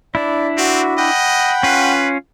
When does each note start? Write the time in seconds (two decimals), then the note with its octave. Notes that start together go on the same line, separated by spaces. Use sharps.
0.15 D4 E4 D5
0.58 C4 F#4
0.98 D#5 F#5 G5 B5
1.63 C#4 F4 B4